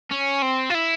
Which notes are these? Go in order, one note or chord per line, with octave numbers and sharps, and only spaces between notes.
C#4
C4
F4
E4